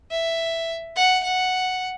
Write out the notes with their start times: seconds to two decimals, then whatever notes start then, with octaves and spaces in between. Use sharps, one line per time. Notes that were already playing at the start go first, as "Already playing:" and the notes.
0.11 E5
0.96 F#5
1.24 F#5